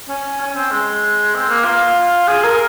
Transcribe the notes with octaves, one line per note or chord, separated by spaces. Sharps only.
C#4
C#4
C4
G#3
C4
A#3
F4
G#4
A#4